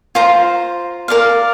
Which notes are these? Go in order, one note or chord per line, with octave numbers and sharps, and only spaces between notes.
F4 C5 A#5
A#4 D5 F5